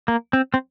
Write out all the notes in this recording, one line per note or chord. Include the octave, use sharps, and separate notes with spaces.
A#3
C4
C4